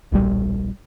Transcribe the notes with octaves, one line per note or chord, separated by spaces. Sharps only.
D1 A#1 G3